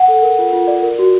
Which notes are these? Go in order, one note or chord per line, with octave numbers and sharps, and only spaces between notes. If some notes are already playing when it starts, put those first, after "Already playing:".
Already playing: F#5
A4
A#4
F4
F4
D5
A#4
F#4